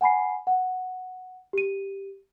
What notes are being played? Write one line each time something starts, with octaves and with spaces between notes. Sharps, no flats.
F#5 G#5 B5 C7
F#5
G4 D#7